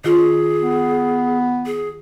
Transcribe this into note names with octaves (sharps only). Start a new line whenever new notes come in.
D#3 F4 G#4
B3
G#4